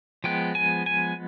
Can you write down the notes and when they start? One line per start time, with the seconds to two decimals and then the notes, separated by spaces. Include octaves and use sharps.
0.24 F3 G#3 B3 G5
0.55 G#5
0.86 G#5